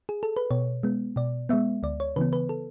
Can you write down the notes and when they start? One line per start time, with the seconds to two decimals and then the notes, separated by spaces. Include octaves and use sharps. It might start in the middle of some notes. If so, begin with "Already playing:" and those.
0.09 G#4
0.23 A4
0.37 B4
0.51 B2 C#5
0.83 G#3 B3
1.16 B2 D5
1.49 G#3 B3 E5
1.83 D2 D5
2.00 C#5
2.16 C#3 E3 B3 B4
2.33 B4
2.49 A4